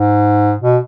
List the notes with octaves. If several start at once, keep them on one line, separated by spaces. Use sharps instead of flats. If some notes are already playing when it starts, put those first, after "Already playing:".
Already playing: G#2
B2